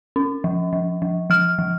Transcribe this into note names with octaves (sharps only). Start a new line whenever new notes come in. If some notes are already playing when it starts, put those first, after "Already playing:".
C#4
F3
F3
F3
F3 F6
F3